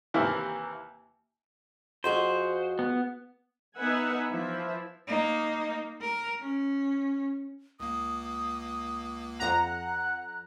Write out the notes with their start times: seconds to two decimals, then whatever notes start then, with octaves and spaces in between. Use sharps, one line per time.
0.14 D#2 C3 E3 A#3 E4 F6
2.04 F2 F#4 G#4 C5
2.79 B3
3.77 B3 D#4 B4 E5 F#5 G#5
4.30 E3 F3 E4 E5
5.08 A#3 D#4
6.01 A#4
6.41 C#4
7.80 C#2 A#3 D#6
9.40 F2 F#5 A#5 F#6